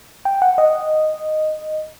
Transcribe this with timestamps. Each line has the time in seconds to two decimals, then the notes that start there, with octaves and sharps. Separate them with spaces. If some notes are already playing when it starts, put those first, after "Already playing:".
0.25 G5
0.42 F#5
0.58 D#5